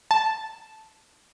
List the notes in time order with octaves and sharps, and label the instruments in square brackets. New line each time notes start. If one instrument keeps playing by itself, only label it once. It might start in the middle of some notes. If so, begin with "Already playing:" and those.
[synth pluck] A5